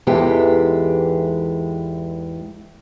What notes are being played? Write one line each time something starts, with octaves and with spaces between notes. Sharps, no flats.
E2 G#2 E3 G#3 G4 A4